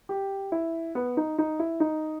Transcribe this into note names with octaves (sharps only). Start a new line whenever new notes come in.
G4
E4
B3
D#4
D#4
E4
D#4